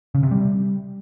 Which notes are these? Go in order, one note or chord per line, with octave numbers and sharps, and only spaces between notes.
C#3
C3
G3